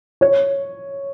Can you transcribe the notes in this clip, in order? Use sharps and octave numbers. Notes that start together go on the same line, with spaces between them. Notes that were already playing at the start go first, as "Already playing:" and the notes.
C#5